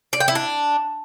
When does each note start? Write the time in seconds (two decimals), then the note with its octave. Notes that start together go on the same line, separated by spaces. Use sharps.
0.13 D5
0.20 G5
0.28 E4
0.35 D4